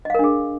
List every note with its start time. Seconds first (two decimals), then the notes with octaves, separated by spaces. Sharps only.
0.05 D#5
0.10 F5
0.15 A#4
0.19 D4
0.24 G#4